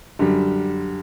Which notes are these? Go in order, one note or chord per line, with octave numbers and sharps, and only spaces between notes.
F#2 D3 G3